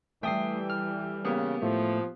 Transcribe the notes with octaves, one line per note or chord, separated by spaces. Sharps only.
E3 G3 A3 A4 E5 G5 D#6 C7
F6
C#3 A#3 B3 G4
A2 F3 A3